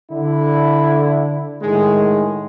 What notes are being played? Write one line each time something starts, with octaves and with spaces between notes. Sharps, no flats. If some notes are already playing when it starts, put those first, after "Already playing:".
D3 E4
A2 D#3 G#3